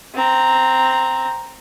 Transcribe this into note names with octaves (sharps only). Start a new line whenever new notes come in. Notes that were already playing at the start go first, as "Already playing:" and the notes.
C4 A#5